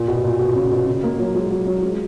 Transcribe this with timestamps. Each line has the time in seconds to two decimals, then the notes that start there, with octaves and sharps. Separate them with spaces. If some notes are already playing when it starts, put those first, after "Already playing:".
Already playing: A#2
0.08 B2
0.24 A#2
0.39 B2
0.55 C#3
0.71 B2
0.87 C#3
1.03 A#3
1.19 F#3
1.35 G#3
1.51 F#3
1.66 F#3
1.82 G#3